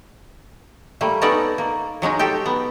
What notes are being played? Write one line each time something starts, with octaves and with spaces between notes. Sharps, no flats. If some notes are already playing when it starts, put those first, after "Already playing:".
G3 A3 A#3
B3 C#4 D#4 A4 D5 F#5
A#3
F#3 G#3 C#4 D#4
G4 A4 G5
B3